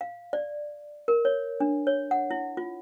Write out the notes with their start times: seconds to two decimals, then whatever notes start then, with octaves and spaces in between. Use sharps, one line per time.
0.01 F5
0.33 D5
1.08 A#4
1.25 C#5
1.60 D4
1.87 C#5
2.11 F#5
2.31 E4
2.57 F4